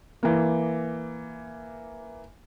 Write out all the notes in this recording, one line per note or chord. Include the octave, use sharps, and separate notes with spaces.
E3 A#3